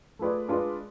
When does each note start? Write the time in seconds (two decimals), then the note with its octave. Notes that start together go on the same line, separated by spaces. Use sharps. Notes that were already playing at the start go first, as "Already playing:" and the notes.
0.19 A3 F4 G#4 B4 D5
0.48 G#3 D4 F4 B4 D5